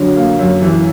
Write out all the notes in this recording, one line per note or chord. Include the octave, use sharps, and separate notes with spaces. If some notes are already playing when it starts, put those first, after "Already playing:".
Already playing: D3 F#3
A#3
F#2
E3